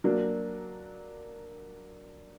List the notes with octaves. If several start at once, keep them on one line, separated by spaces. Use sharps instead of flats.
F#3 A#3 D4